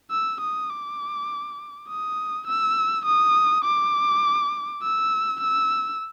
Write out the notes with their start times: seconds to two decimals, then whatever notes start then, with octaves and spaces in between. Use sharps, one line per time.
0.11 E6
0.40 D#6
0.69 D6
1.88 D#6
2.47 E6
3.05 D#6
3.64 D6
4.82 E6
5.40 E6